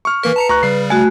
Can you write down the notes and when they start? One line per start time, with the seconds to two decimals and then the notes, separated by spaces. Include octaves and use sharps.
0.05 C#6 F6
0.23 E3 A#3 A#4 B4
0.36 A5 A#5 C#7
0.49 D2 A#5 C#6 F#6
0.63 C#3 G3 C7
0.90 A3 F#4 G#5